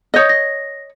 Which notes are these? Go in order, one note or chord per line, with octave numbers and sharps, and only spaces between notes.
C#5 D#5 D#6 G6 A#6
A#6